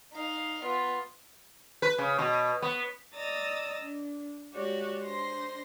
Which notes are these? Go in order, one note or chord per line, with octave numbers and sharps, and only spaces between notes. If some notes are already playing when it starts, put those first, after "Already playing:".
D#4 F5
B3 F4
B4
C#3
B2
B3
D5 D#5 A#5 D#6 E6 A6
D4
G#3 F#4 G4 C#5 D5
D4 C5 C6 A#6